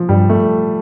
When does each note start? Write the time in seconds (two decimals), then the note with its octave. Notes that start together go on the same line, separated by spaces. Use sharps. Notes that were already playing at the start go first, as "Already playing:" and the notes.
Already playing: F3
0.09 G2 G3
0.30 A3